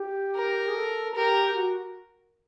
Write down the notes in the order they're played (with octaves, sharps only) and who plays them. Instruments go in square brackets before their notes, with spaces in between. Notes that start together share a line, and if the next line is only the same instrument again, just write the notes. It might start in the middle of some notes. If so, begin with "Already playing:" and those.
Already playing: [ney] G4
[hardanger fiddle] A#4
[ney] G#4
A4
[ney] G4 [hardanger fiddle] A#4
[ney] F#4